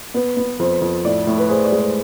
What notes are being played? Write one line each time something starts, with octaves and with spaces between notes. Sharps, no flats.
B3 B4
B3
F2 C5
F2
A2 D5
A2
B4
G#4 C5
D5
G#3
C5